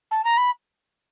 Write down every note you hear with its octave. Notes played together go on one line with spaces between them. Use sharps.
A5
A#5
B5